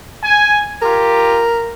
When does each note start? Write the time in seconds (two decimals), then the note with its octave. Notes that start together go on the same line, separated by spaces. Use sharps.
0.23 G#5
0.82 F4 G4 A#4